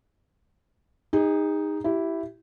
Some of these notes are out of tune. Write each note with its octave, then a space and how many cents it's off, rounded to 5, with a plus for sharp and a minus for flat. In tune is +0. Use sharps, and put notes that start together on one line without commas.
D#4 +0 G#4 -40
E4 +0 G4 -20